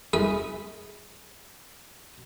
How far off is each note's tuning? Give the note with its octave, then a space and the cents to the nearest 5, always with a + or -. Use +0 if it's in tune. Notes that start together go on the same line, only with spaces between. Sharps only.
E4 -40 G#4 -5 B5 +0